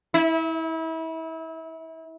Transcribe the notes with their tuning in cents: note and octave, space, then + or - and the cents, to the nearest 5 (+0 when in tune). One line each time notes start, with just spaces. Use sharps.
E4 -30